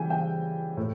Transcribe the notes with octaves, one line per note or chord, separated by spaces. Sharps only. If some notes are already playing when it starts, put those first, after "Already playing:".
Already playing: C#3 E3 G3 G5 G#5
G5
A2